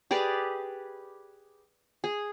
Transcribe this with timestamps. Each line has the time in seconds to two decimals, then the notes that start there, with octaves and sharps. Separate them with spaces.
0.11 G4 G#4 B4 D5
2.04 G#4